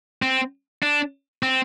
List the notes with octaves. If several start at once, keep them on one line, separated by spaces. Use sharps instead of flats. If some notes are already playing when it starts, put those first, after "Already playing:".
C4
D4
C4